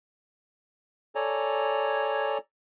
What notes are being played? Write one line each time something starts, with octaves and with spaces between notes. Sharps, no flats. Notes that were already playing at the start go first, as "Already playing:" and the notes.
A4 C#5 D5 G#5 A#5